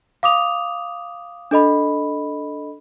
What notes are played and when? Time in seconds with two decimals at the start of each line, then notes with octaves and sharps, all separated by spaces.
0.23 F5 D6 D#6 F7
1.51 D4 A4 D#5 B5